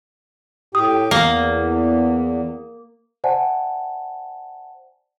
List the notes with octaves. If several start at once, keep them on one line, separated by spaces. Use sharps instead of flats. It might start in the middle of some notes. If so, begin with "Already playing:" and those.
A2 G4 G5 D#6
E2 A#3
C5 D5 E5 F#5 G#5 A5